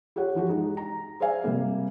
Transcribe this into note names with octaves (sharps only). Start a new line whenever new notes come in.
F4 G4 C#5 F#5
E3 F3 F#4 G4
G#3 D#4
A#5
G#4 C5 D5 E5 F5 G#5
C3 G3 A#3